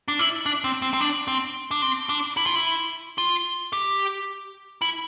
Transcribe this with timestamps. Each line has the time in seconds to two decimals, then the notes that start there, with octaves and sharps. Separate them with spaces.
0.08 D4
0.19 E4
0.46 D4
0.64 C4
0.82 C4
0.93 C4
1.00 D4
1.28 C4
1.71 D4
1.82 C4
2.09 D4
2.37 E4
2.46 F4
2.55 E4
3.18 F4
3.73 G4
4.82 E4